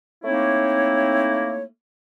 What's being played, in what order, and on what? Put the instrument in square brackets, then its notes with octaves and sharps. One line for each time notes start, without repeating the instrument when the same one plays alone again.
[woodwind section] A3 A#3 C4 D#4 E4 C#5